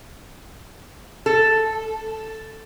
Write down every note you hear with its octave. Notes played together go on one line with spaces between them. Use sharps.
A4